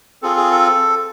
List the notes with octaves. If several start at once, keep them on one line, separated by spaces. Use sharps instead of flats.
C4 F4 G#4 A4
G#4
A4